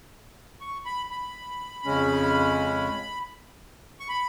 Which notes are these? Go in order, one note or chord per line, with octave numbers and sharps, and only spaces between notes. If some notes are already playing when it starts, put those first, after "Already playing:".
C#6
B5
B5
F2 C#3 G#3 C#4
C#6
B5